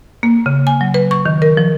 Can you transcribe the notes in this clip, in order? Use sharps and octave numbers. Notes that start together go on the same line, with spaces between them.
A#3
C#3
G#5
F#3
B4
C#6
D#3
A#4
F3